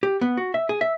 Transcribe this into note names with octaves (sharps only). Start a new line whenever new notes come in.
G4
B3
F#4
E5
G#4
E5